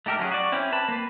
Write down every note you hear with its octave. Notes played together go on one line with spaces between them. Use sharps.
A3 D#4 G4 A4 A#4
F#3 C#4 F4 G#4
F#4 D5
C4 C#4 E4
B4 A5 B5
A#3 B4